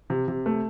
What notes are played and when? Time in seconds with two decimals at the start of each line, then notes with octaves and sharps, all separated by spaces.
0.10 C3
0.28 C3
0.46 A3